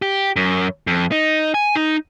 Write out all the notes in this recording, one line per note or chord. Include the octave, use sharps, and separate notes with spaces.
G4
F#2
F2
D#4
G#5
D#4